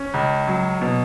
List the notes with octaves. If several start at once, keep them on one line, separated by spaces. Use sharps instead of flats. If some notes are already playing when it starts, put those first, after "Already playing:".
Already playing: C#4
C#2
F#3
B2